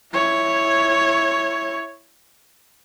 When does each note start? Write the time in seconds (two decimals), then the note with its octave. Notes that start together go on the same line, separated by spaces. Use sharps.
0.13 E4 C#5